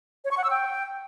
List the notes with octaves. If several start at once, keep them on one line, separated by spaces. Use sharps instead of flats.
C#5
C#6
F#5
E6
G5